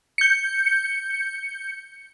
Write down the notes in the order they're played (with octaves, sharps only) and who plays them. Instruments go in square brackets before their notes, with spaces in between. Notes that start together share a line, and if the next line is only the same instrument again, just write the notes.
[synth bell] G6 C#7